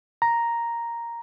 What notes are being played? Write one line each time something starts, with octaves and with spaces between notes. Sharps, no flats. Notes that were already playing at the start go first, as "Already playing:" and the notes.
A#5